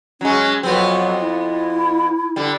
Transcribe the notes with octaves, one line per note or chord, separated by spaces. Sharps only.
F#3 G#3 C#4
F2 F#3 B3 C4
E4
D3 G3